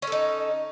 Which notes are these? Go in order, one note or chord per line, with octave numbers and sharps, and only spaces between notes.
C#4 D#4 A4